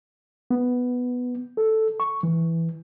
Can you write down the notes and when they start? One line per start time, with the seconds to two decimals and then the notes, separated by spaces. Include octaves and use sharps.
0.51 B3
1.57 A4
2.00 C#6
2.23 E3